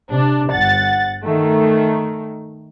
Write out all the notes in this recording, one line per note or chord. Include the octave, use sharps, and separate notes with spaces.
C3 D4
G1 F#5 A6
D#3 A3